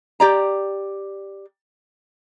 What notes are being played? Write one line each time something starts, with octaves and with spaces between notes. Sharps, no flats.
G4 D5 A#5